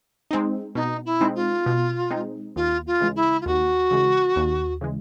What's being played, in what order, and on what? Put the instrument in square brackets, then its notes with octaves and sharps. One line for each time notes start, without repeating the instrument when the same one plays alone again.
[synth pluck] G#3 C4 D#4
[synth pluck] B2 [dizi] D#4
[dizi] E4
[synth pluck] G#3 C4 D#4
[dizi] F4
[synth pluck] B2
G#3 C4 D#4
[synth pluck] D#2 [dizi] F4
[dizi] F4
[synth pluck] C#3 E3 G#3
[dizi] E4
F4
[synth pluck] D#2 [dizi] F#4
[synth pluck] C#3 E3 G#3
D#2
C#3 E3 G#3